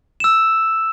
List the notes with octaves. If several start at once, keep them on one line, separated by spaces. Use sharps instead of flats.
E6 E7